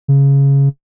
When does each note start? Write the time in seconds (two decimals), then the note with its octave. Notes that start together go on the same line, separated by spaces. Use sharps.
0.08 C#3